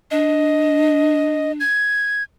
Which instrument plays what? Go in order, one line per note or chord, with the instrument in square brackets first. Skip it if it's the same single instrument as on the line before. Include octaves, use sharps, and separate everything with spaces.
[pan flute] D4 [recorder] D#5
[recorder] G#6